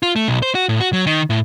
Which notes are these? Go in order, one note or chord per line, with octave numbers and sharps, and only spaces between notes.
F4
A3
B1
C5
F#4
A2
F#4
F#3
D#3
A2